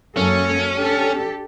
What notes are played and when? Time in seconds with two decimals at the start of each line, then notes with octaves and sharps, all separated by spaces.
0.17 F#2 A#3 C#4 A4
0.74 D4 G4 A4